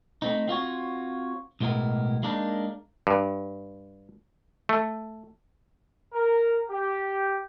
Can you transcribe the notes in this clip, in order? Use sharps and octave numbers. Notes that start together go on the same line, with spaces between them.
A3 C4 D#4
C4 F4 F#4 C#5
B1 A2 G#3 B3 E4 A#4
G#3 A#3 D4 D#4 A#4
G2
A3
A#4
G4